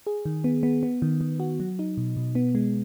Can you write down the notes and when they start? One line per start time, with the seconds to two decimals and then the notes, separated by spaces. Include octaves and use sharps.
0.07 G#4
0.25 D#3
0.44 B3
0.63 B3
0.83 B3
1.02 D#3
1.21 D#3
1.40 F#4
1.60 F#3
1.79 D#4
1.97 B2
2.17 B2
2.35 B3
2.55 G#3